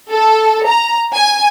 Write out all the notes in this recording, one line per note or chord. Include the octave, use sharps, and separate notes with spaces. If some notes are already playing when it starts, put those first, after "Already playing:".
A4
A#5
G#5